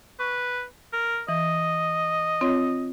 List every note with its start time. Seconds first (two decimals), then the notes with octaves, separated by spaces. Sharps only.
0.19 B4 C#6
0.93 A#4
1.29 E3 D#5
2.41 C4 F4 C#5